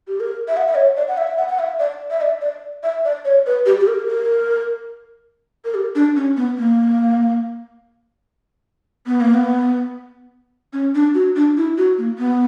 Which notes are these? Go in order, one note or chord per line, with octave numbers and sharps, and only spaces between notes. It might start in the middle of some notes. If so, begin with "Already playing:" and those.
G4
A#4
E5
F#5
E5
C#5
D5
F#5
E5
F#5
F#5
E5
D5
E5
D5
D5
E5
D5
C#5
B4
G4
G4
A#4
A#4
A#4
G4
D4
C#4
B3
A#3
B3
A#3
B3
C#4
D4
F#4
D4
E4
F#4
A#3
B3